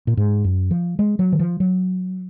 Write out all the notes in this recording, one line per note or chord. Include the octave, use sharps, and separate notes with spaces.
A#2
G#2
F#2
F3
G#3
F#3
D#3
F3
F#3